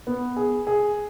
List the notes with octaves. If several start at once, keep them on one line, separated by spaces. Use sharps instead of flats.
B3
G#4
G#4